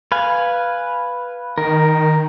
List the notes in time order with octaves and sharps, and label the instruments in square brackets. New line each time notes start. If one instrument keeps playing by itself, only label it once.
[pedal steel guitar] B4 F5 G#5
[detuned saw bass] D#3 [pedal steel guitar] A#4